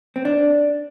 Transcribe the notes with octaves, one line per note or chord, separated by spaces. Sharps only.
C4
D4